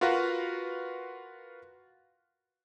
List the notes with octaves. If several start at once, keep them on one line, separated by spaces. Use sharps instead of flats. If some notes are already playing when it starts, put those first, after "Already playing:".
F4 F#4 A#4 B4 F5 F#5